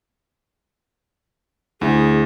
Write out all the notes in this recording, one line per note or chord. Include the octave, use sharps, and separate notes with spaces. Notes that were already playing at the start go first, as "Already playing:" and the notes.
D2 E4 G#4